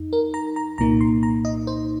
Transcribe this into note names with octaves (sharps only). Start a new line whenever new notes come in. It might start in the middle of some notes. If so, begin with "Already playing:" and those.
Already playing: F2 D#4
A#4
A#5
A#5
C2 A#2 A#3 D#4 A#5
C6
A#5
D#5
C5